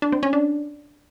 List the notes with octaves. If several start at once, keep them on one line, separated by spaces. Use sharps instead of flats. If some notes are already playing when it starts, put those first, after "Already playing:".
D4
C4
C#4
D4